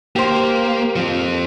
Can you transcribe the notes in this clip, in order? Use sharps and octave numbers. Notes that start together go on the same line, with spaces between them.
A#3 G4 C5
F3 C4